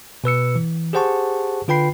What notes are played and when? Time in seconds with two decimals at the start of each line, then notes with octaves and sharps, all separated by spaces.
0.24 B2 B4 E6 C#7
0.56 E3
0.93 G4 G#4 C5 F#5 A5 C#6
1.68 D3 F4 B4 G5 B5 C7